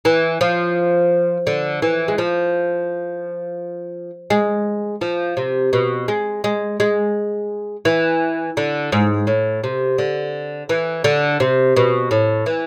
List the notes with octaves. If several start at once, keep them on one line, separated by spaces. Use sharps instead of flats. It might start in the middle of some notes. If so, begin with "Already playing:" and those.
E3
F3
D3
E3
G#3
F3
G#3
F3
C3
B2
G#3
G#3
G#3
E3
D3
G#2
A2
C3
D3
E3
D3
C3
B2
A2
E3